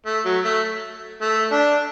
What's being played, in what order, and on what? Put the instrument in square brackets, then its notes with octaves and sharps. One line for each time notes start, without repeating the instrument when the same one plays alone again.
[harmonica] A3
F#3
A3
A3
D4